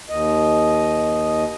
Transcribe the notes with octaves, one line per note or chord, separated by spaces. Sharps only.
D#2 D#5